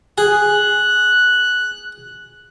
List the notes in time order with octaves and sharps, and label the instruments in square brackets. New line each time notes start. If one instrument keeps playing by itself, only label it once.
[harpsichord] G#4 [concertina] F#6